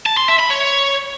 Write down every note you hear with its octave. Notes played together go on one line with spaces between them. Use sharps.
A5
C6
E5
B5
C#5